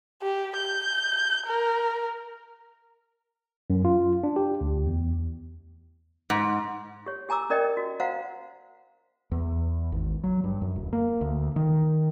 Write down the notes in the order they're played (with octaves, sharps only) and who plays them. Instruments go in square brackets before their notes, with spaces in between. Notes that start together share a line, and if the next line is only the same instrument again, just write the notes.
[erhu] G4
G6
A#4
[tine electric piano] F#2
F4
D4
G4
D2
E2
[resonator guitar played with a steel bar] G#2
[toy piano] G4 C#5
G4 G#5 A#5 D6 E6
C#4 A#4 D5 D#5 G5
F#4
F#4 C5 F5 F#5 A#5
[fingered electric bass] E2
G#1
F#3
G2
F#2
D1
A#3
D2
D#3